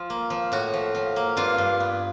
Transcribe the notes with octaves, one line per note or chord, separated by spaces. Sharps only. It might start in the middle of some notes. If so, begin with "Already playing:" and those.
Already playing: F3 F4
A#3
F3
A2 F#4
F3
F3
A#3
G2 F4
G2
B3